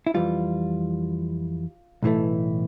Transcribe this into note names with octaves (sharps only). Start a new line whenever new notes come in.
E4
F2 E3 G3 F4
B1 A2 E3 A3